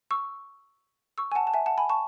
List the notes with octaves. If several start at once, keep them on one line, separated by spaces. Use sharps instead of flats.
C#6 E6
C#6 E6
G#5
F#5 A5
A5
E5 G#5
F#5 A5
G#5 B5
A5 C#6